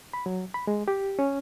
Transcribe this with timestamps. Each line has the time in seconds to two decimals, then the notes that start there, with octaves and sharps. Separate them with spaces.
0.13 B5
0.26 F#3
0.54 B5
0.67 G#3
0.88 G4
1.19 C#4